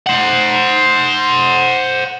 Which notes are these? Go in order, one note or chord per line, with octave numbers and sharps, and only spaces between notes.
C5 F#5